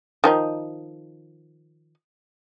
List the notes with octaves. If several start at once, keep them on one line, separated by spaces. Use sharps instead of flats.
D#3 F3 D#4